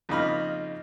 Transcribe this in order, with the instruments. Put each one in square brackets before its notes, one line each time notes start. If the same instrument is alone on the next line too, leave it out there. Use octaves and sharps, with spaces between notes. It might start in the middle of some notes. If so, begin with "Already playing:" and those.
[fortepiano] F2 C#3 A#3 D#4 B5 F6